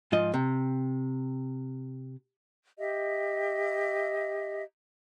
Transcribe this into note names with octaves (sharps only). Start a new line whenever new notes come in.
G#2 F3 F4 D#5
C3
G4 D#5 E5